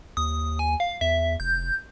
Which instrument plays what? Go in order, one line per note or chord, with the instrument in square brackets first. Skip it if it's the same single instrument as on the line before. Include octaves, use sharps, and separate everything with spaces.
[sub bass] D#2 [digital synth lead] D#6
[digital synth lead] G#5
F5
[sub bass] E2 [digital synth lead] E5
[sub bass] F1 [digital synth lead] G6